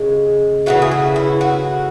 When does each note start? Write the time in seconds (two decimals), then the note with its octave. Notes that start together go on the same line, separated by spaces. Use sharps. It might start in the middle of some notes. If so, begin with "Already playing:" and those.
Already playing: C#3 G#3
0.66 C#3 E3 A3 F#4
0.82 G#4
0.91 F#4
1.16 E4
1.41 F#4